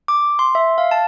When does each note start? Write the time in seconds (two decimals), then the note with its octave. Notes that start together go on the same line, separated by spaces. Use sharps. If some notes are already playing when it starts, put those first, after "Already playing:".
0.08 D6
0.39 C6
0.55 E5
0.78 F5
0.91 A5